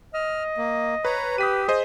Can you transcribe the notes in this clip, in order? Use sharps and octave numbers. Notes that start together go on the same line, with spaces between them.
D#5 F6
A#3
B4 C#5 A#5
G4 B4 D#6 B6 D#7
G#4 C5 D#5 D#6